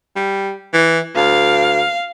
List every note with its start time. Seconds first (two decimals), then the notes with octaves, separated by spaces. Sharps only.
0.16 G3
0.74 E3
1.16 D2 F5